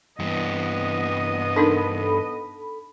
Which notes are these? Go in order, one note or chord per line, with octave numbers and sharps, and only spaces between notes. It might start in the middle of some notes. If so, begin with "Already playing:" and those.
G2 E3 B3 D#5
D4 D#4 A4 A#4 B5